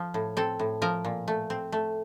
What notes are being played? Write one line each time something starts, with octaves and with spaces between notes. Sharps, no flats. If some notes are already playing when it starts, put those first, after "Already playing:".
Already playing: F3
A2
C4 A4
A2
F3 A#4
A#2
A3
C4
A3